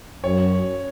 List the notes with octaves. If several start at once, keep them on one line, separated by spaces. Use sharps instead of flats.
F#2 C#5